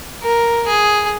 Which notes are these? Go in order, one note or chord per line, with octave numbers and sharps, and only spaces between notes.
A#4
G#4